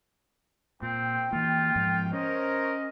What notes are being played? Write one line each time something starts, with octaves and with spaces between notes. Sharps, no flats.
A#2 C4 G5
E3 A#3 F4
G#2 F3
C#4 A#4 C5 C#5 D#5